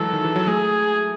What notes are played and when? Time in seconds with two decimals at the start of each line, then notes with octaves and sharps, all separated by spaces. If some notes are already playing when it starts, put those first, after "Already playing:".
Already playing: E3 F#3 G#3 A4
0.13 D#3
0.25 E3
0.36 F#3
0.47 A3 G#4